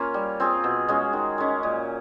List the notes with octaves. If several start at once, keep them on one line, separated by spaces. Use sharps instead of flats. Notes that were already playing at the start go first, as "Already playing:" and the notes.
Already playing: A#3 C#4 F4
G3
C4 F4 G#4
B2
G#3 C#4 F#4
D#3
G#3 C#4
A#2